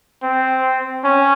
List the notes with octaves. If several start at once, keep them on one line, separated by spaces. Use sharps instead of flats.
C4
C#4